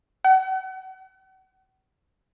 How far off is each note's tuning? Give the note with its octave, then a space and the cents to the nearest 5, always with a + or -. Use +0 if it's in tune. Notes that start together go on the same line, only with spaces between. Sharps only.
F#5 +45